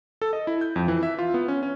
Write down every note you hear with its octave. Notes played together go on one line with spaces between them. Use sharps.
A4
D#5
E4
G6
F2
E3
E5
F4
B3
C#4
C#4